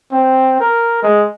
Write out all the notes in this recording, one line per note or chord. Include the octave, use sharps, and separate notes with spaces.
C4
A#4
G#3